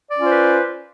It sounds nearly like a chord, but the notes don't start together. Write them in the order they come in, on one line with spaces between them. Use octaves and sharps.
D5 C#4 F4 C5 B4